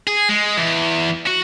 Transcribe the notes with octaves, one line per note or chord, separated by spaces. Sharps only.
G#4
G#3
E2
F#4